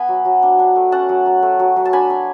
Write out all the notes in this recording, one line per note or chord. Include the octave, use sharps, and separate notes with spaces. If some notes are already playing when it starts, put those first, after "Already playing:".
Already playing: B3 G#5 B5
F#3
F#3
D4
D4
A3
C#4 F#5 A5
F#3
F#3
A3
F#3
F#3
A5
D4 G#5 B5
D4